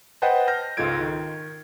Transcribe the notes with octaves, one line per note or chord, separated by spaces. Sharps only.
B4 C5 D#5 F#5 G5 A5
F6 G6 A#6
C#2 G#2 F4 A4 G#6 D7
D#3